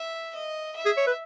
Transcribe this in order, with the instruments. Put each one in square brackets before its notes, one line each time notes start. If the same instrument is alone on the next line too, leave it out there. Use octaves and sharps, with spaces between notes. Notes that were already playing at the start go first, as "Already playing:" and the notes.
Already playing: [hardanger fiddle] E5
D#5
E5
[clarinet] G#4
C#5
B4